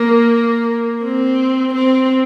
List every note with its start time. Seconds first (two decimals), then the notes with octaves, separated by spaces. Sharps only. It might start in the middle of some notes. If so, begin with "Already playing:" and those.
Already playing: A#3
1.04 C4
1.74 C4